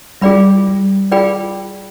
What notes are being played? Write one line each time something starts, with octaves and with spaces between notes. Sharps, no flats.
G3 F4 G#4 D5 G5 B5
G3
F4 G#4 D5 G5 B5